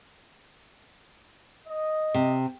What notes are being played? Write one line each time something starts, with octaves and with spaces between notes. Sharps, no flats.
D#5
C3